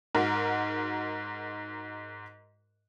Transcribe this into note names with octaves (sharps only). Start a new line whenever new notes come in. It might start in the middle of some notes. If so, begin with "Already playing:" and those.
G#2 F#4 A#4